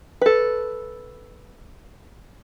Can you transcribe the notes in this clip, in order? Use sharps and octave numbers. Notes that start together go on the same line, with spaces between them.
A4 B4